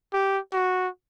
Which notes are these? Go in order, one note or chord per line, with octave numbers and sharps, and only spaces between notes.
G4
F#4